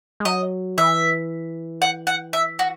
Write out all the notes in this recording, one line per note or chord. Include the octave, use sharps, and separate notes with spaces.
G#3
F#3 D#5
E3 E5
F#5
F#5
E5
F#4